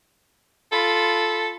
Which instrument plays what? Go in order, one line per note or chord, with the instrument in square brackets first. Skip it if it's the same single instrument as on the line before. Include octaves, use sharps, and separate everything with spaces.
[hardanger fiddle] F4 B5 [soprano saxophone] A4